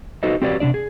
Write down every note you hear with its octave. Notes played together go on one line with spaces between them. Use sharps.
D#4 F#4 A4 B4 C5 D#5
C4 F#4 G4 B4 C#5 D5
C3 D#3 D4 D5
G#4